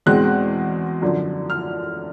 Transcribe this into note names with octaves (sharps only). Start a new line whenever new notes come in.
E2 B2 G#3 C4 F#6
F#2 D3 F3
F6